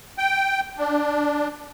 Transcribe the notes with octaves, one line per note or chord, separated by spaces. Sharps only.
G5
D4